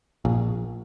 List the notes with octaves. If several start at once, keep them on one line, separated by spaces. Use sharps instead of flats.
A#1